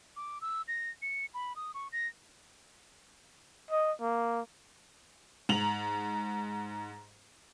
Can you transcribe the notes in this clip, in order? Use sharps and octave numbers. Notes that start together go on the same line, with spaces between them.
D6
E6
A#6
C#7
B5
D#6
C#6
A#6
D#5
A#3
G#2 A#5 F7 F#7